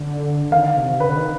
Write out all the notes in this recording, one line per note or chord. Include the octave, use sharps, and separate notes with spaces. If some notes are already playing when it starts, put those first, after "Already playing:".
Already playing: D3
D#3 F5
C3
D3 B4
D#3